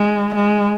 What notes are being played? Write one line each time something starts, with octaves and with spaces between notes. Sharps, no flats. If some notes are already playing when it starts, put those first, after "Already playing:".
Already playing: G#3
G#3